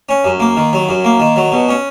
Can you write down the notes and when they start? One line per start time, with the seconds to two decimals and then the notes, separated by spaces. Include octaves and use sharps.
0.09 C#4
0.24 F#2
0.40 A#3
0.57 D#3
0.73 F#3
0.89 F#2
1.04 A#3
1.20 D#3
1.36 F#3
1.52 B2
1.68 C#4